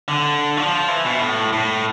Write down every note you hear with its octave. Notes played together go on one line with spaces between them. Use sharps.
D3
F3
E3
B2
A2
A2